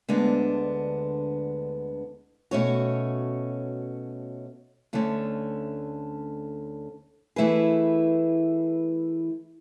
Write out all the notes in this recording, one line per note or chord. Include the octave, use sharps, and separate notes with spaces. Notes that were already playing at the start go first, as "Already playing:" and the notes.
D2 D3 G#3 B3 D4
B2 A3 C#4 F#4 C#5
D2 D3 A3 C#4
E3 A3 E4 G#4 B4